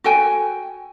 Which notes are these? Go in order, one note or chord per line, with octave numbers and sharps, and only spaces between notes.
F#4 A4 G5 G#5